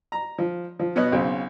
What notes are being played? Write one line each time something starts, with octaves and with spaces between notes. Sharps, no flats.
A#5
F3
F3
B2 B3 C#5 D#5 F#6
B1 C#3 C4